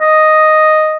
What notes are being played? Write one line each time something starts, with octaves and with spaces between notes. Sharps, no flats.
D#5